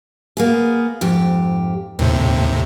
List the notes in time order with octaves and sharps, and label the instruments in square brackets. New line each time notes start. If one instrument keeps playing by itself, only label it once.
[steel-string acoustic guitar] A#3 B3 G#4
F2 G#2 G4
[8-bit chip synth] D#2 A2 C3 [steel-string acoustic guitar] C4